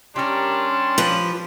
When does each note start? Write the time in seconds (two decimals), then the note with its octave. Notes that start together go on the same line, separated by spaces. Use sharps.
0.16 G3 C#4 D4 G4 A#4 C6
0.98 F3 F4 B4